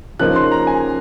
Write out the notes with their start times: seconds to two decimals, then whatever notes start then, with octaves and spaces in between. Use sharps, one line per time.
0.19 C#3 F3 A#3 D#4 F#6
0.36 C6
0.52 A#5
0.67 G#5